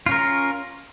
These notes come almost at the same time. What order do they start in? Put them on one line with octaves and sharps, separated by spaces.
F4 C#4 A#4